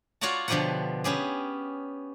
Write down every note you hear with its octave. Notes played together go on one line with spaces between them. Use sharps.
F4 F#4 C#5 D5 F#5 A5
B2 D3 F3 G4 B4 F#5
B3 C#4 G4 G#4